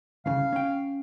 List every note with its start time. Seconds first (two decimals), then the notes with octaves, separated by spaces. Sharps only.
0.26 C2 C#3 F5
0.53 C#4 G5